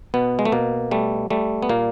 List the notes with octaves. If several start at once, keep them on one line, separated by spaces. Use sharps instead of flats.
B2 B3
G#3
A3
B2 A#3
G3 A3
G3 A3
B3
A#2 A#3